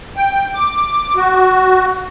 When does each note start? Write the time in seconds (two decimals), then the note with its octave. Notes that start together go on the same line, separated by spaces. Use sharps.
0.17 G5
0.54 D6
1.16 F#4